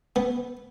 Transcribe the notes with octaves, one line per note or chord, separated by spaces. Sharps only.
B3